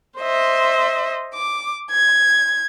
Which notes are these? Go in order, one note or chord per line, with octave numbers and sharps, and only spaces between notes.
C5 D#5 E5
D6
G#6